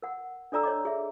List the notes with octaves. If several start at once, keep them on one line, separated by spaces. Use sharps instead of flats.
A#4 F#5
D4 A4 D5 A#5 E6
C#5 D#5 D6
G#4 E5